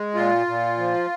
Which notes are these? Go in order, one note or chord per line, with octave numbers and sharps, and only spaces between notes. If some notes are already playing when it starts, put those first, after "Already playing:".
Already playing: G#3
A#2 F4
A#2
F3